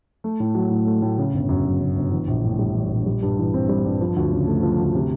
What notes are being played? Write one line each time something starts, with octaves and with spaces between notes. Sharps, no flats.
A3
A2
F#3
A2
A3
A2
C#3
G1
F#2
F#3
C#3
G1
E3
A#1
A2
G3
E3
A#1
G3
G2
E3
C4
G3
G2
F3
D2
C#3
A3
F3
D2
C3